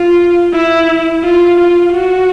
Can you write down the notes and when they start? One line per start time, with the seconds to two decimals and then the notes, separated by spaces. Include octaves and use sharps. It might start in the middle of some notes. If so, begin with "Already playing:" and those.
Already playing: F4
0.53 E4
1.23 F4
1.58 F4
1.92 F#4